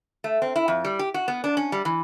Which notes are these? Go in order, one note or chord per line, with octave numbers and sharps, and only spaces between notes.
A3
C4
E4
F2
G3
G4
F#4
B3
D4
C#4
G3
E3